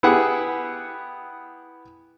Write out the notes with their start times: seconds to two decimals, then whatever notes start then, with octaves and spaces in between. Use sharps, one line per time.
0.03 B3 E4 G4 G#4 F#5